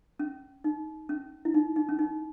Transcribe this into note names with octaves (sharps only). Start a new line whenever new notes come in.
C#4
D#4
C#4
E4
D#4
D#4
C#4
D#4